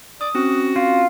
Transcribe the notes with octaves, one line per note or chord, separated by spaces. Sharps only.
D5 D#6
C4 C#4 F#4
F4